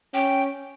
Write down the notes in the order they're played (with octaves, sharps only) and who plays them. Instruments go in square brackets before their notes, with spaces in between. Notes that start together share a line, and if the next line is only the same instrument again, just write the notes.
[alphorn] C#4 [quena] G5